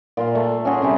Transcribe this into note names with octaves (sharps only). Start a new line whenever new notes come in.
A#2 F4 F5
A3
C#4 F#4 G#4 C6
C3 G3 C#4 G4